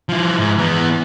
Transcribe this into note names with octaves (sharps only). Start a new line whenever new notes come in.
F3 E4
G#2
E3 B3